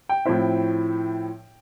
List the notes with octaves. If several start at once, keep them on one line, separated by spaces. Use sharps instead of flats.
G5
A2 F3 C4 E4